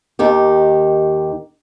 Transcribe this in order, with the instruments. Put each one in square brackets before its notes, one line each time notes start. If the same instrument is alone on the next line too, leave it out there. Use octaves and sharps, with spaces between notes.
[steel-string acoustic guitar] D#2 D#3 G4